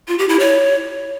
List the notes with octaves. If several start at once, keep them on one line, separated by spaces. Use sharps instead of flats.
F4
G4
E4
C#5